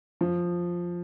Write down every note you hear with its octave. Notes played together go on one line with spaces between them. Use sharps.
F3